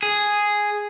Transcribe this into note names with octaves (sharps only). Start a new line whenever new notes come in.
G#4